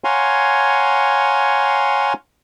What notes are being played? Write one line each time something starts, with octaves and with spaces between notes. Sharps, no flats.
C#5 F5 F#5 G#5 A#5 C6